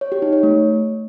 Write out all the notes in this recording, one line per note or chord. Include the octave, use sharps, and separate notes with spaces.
C#5
G4
D#4
C#5
A3